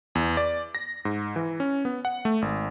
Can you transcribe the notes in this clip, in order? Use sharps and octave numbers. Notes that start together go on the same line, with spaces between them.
E2
D5
A#6
G#2
E3
C#4
B3
F#5
A3
G#1